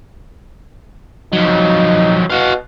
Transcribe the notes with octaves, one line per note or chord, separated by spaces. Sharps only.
F2 F#3 D#4
B2 F#4 F5